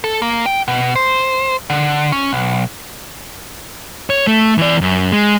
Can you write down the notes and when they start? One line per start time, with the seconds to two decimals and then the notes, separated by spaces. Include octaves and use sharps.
0.04 A4
0.22 A#3
0.46 G5
0.68 B2
0.95 C5
1.70 D3
2.12 C#4
2.33 B1
4.10 C#5
4.27 A3
4.58 E3 D5
4.81 F#2
5.12 G#3